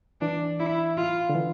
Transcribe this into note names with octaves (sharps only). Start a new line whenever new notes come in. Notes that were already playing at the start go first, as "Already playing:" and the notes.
E3 D4
E4
F4
D3
E3